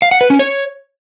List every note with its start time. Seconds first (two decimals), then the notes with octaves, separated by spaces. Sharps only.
0.02 F5
0.11 F#5
0.21 B4
0.30 C#4
0.39 C#5